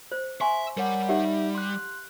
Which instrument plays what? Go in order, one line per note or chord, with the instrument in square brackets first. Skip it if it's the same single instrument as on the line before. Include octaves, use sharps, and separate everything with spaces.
[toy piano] C5
[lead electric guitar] E5 [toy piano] G#5 C6 C#6
[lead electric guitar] G3 [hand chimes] A#4 C#5 F#5
[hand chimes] D#4 E5 [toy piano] G4 C#5 F#5
[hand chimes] C6 F#6